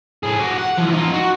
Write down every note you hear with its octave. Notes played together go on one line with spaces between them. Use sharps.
A2 G#4
F#4 G4
F#5
E3 F3
D#4 F4
F#4